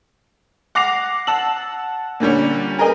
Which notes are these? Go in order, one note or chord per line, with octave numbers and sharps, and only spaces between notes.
F#5 D6 A#6 C7 F7
F#5 A5 E6 F#7
A#2 D3 G3 C#4
G#4 A#4 B4 D#5 G#5